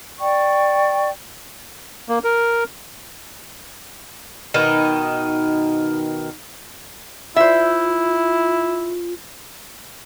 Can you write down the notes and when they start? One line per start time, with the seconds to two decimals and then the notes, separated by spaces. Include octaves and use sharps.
0.19 D5 G5 C#6
2.09 A#3
2.24 A#4
4.54 B2 D#3 D#4
7.36 E4 F4 C5 E5